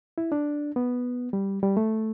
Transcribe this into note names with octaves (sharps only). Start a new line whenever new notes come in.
E4
D4
B3
G3
G3
A3